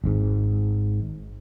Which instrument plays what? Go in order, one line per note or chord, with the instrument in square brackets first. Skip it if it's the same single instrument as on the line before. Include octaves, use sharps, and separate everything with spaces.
[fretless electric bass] G#1 G#2